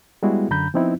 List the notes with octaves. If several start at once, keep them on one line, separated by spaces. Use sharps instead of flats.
G3 G#3 B3 E4 F#4 G#4
F#2 D3 A#5 B5 G6
F3 B3 C4 D#4 E4